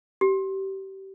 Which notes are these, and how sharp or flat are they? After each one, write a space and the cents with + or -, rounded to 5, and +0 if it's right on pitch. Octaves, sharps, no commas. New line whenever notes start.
G4 -30